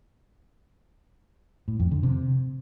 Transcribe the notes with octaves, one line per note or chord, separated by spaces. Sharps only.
A2
F2
D3
C3